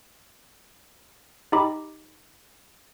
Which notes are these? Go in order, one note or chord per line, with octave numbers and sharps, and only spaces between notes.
D#4 G4 D#5 A#5 B5 D6